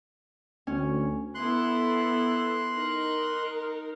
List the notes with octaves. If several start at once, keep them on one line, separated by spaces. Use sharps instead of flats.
D2 C#4
B3 E4 A4 C6 F#6
D#4 A#4